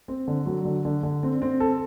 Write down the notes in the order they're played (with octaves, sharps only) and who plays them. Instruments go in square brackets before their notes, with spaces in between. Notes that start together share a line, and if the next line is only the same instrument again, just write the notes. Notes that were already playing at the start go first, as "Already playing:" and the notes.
[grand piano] C4
D3
F#3
D3
D3
D3
C4
C4
A4